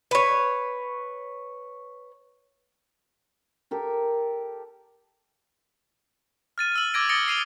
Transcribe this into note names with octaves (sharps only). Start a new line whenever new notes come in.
B4 C#5
G4 A4 A#4
F6 A6 D#7
E6 F#7
D6 E6 G#6 A#6 D7
D#6 A6 A#6 C#7 D7 G7
C7 D#7 F7 G7